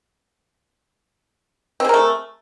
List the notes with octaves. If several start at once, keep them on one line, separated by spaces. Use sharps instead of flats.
A3 C4 G#4 A#4